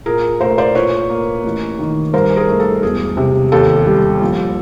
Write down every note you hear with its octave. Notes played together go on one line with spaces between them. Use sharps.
A#2 G#4 A#4
A3 A#4 C5
C5 D5
A#2 B4 C#5
A#3
A1
D#3
G2 A#4 C5
G#4 A#4
A3
A4
E1 G#4
C3
D#2 A4
G3
A#1